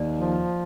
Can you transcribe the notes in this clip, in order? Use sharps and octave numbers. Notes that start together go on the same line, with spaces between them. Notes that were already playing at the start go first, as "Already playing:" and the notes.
Already playing: D#2 D5
F3